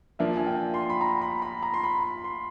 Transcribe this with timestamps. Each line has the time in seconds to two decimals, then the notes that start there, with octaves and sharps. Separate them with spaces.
0.19 F3 A#3 D4 E5
0.37 G#5
0.46 G5
0.74 C6
0.90 B5
1.01 A#5
1.22 B5
1.42 B5
1.62 A#5
1.74 C6
1.84 B5
2.04 B5
2.24 C6